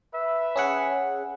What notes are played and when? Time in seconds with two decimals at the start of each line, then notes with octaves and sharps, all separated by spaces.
0.12 B4 E5
0.56 C#4 G#4 F#5